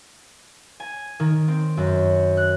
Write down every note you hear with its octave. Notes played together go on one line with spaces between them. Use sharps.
G#5
D#3
C4
F#2
F#6